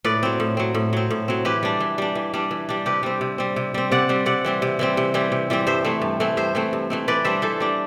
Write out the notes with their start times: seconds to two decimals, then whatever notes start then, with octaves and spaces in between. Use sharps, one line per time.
0.04 A2 B4 D5
0.23 F#3 C4
0.40 A2
0.57 F#3 C4
0.75 A2
0.93 F#3 C4
1.11 A2
1.28 F#3 C4
1.45 E3 G4 B4
1.63 G3 D4
1.80 E3
1.98 G3 D4
2.15 E3
2.34 G3 D4
2.51 E3
2.69 G3 D4
2.86 C3 G4 B4
3.03 G3 C4
3.21 C3
3.38 G3 C4
3.56 C3
3.74 G3 C4
3.91 C3 D5 F#5
4.09 G3 C4
4.26 C3 D5 F#5
4.45 E3 G3 C4
4.62 C3
4.79 E3 G3 C4
4.97 C3
5.14 E3 G3 C4
5.32 C3
5.50 E3 G3 C4
5.67 G2 C5 E5
5.84 E3 A3 C4
6.02 G2
6.20 E3 A3 C4
6.37 G2 C5 E5
6.55 E3 A3 C4
6.73 G2
6.90 E3 A3 C4
7.08 E3 B4 D5
7.25 G3 D4 C5 E5
7.42 E3 A4 C5
7.60 G3 D4